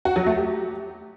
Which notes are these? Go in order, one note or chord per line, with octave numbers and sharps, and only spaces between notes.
F#4
F#3
A3
G4